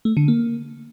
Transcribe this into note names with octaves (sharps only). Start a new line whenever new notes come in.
A3
D3
A#3